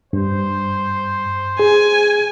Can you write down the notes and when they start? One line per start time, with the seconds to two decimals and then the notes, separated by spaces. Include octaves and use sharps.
0.13 G2 C5
1.59 G#4 G#5